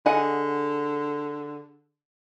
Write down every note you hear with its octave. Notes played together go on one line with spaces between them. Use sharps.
D3 G#4 D#5 F#5